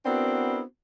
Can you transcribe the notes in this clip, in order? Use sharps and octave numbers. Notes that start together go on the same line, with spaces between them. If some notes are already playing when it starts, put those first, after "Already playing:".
B3 C4 D4 E4 F#4 A#4